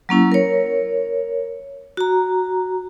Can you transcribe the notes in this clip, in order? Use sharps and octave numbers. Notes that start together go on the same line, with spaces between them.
F#3 A#3 C#4 E4
A#4 C#5
F#4 A#5